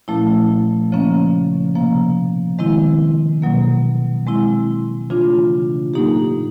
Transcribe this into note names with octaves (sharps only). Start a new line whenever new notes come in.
A#2 F3 A3 C#4 E4
C#3 F3 A#3 C#4
C3 F3 A#3
D#3 G#3 C4 E4
B2 F#3 A#3
G#3 C4 E4
C#3 E3 A3 D4 F4
A2 F#3 A#3 D#4 G4